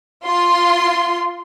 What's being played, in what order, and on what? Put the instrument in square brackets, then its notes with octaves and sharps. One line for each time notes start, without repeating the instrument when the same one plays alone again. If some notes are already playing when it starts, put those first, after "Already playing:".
[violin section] F4 C6